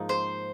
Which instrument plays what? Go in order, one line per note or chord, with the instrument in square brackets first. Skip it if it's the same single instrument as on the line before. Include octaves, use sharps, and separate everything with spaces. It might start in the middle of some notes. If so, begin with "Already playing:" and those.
Already playing: [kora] G#2 F3 A#3 D#4
[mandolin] C5